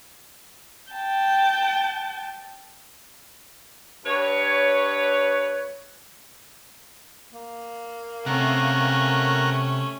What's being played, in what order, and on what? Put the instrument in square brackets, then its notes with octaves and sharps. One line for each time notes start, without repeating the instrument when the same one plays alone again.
[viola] G5 A5
[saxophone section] G2 B4 C#5
[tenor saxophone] A#3
[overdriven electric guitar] C3 [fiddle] A3 C#4 [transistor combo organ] A#4 F#5